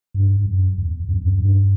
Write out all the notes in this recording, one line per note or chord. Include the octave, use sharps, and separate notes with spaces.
G2
F#2
E2
F#2
E2
F#2
G2